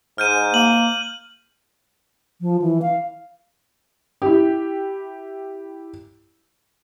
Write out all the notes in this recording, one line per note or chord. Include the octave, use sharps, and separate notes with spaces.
G#2 F6 G6 D#7
A#3 F#7
F3
E3
F5
E4 G4